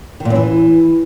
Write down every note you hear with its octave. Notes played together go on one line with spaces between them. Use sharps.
D#3
A#2
F#2
E3